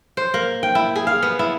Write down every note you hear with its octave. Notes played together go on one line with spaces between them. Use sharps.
C5
A#3
G5
E4
G#4
F5
B3
E4